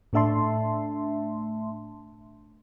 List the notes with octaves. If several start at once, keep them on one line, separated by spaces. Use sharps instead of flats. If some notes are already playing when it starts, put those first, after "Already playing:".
A2 A3 D4 E5 A5 C6